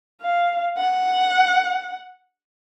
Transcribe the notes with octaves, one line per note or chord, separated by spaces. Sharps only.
F5
F#5